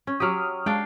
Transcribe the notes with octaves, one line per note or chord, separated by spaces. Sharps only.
C#4
F#3 G4 D#6 F6
G#3 D4 F5 G5